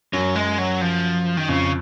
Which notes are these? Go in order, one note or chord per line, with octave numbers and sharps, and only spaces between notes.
F#2 F#3
G#3
F#3
F3
D#3
F2 C#3